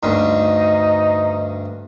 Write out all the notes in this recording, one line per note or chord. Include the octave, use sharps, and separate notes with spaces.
D2 G2 D#4